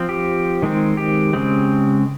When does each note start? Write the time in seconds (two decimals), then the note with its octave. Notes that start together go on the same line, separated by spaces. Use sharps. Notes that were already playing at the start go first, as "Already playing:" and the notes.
Already playing: F3 C4
0.09 G4
0.62 D#3 G#3 C4
0.97 G4
1.33 C#3 G#3 C4